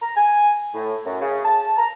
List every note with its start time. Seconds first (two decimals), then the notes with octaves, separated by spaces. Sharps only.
0.02 A#5
0.16 G#5
0.74 A2
1.06 F#2
1.21 C#3
1.45 A5
1.77 A#5